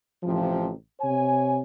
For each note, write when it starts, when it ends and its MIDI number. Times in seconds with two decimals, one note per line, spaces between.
0.23 0.70 33
0.23 0.70 48
0.23 0.70 53
1.00 1.60 48
1.00 1.60 73
1.00 1.60 80